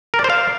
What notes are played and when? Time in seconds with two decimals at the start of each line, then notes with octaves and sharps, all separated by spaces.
0.14 A#4
0.19 D5
0.24 C5
0.30 F5